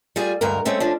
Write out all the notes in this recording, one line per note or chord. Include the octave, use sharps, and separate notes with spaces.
G3 F4 G#4
D2 G2 G#3 A#4
G#3 A3 C4 C#4
F3 C#4 D4